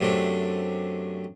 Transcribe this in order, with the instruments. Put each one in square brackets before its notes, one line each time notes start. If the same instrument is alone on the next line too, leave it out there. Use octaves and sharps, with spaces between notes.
[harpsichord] F#2 C3 A3 D4